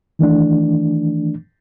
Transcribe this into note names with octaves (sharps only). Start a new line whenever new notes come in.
D#3 E3 A3 D4